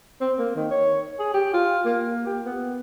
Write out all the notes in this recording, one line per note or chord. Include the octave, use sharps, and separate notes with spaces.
C4
A#3
D#3
C#5
G#4
G4
F4
A#3
G4
B3